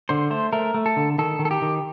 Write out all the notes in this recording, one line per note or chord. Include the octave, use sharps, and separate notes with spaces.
D3 C5
A3 C5
A3 A#4
A3
A4
D3
D#3 A4
D#3
A4
G4
D#3